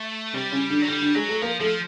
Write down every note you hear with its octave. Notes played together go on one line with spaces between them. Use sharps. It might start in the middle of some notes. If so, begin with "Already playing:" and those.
Already playing: A3
C3 G3 C4
C#3 C#4
D3 D4
F#3
D3 G3 D4
D3 D4
F#3 G#3 G#4
A3 A4
F3 A#3 A#4
F3 A3 A4